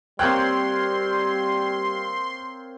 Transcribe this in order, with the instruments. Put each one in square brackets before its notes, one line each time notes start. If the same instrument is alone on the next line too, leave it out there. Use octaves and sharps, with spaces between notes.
[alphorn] G3 [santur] A#3 C4 C#5 [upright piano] G5 F#6 [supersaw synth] C6